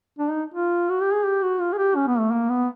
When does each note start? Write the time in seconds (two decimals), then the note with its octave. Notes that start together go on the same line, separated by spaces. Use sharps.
0.19 D4
0.30 D#4
0.54 F4
0.90 F#4
1.01 G4
1.13 G#4
1.25 G4
1.42 F#4
1.60 F4
1.73 G#4
1.78 G4
1.96 C#4
2.08 B3
2.19 A3
2.31 A#3
2.49 B3